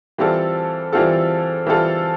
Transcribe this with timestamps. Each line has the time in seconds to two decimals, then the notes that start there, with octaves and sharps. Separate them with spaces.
0.18 E3 G3 C4 F4 A4
0.92 E3 G3 C4 F4 A4
1.66 E3 G3 C4 F4 A4